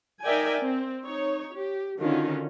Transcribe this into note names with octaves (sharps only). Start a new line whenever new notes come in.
D#4 A#4 D5 E5 G5 G#5
C4
D#4 C#5
G4
D3 D#3 C#4 F4 F#4